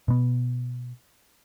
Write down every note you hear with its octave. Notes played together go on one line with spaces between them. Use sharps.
B2 B3